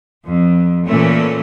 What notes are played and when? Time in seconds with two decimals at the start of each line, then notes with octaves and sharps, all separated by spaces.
0.24 F2
0.84 A#2 E3 A3 C#4